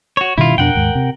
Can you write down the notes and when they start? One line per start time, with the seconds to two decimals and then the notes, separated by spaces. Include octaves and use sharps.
0.17 F#4 C#5
0.38 G2 B2 D#3 E4 F4
0.58 F2 B2 D4 A#4 F#5 G5
0.75 D#2 G#2
0.95 C3